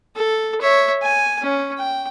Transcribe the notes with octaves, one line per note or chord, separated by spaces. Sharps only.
A4
C#5 E5
G#5
C#4
G5